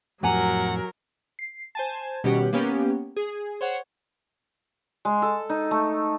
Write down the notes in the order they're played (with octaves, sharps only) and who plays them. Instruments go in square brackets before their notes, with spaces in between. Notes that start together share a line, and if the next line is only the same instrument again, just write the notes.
[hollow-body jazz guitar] F2 A2 [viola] F#3 A#4 [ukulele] G4 G#5 A#5 [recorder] F#5
[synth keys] C7
C5 G#5 A5
B2 D#3 G3 C#4 G4 F#5
A#3 B3 C#4 G4
G#4
C5 C#5 F#5
[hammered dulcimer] G#3
A4
D#4
A3